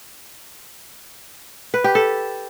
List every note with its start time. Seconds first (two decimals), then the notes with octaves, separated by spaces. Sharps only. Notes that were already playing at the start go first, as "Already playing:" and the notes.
1.74 B4
1.84 G4
1.95 A4